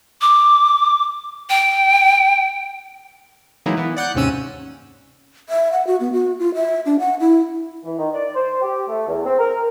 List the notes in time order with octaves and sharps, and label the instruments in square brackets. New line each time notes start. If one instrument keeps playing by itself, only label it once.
[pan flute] D6
G5
[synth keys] E3 F#3 G#3 A#3 D#4 E4
E3 B3
D5 F#5 F#6 G6
D#2 G#2 C3 C#4 E6 D#7
[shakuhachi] E5
F#5
F#4
B3
F#4
F4
E5
D4
F#5
E4
[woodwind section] E3
D#3
D5
C5
G4
A3
E2
C4
A#4